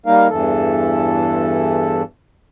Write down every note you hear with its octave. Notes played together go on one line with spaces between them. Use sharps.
G3 A#3 D#4 A#4 F5
E2 G2 E3 A4